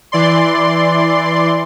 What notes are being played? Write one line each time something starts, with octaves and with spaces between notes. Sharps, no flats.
E3 D5 C6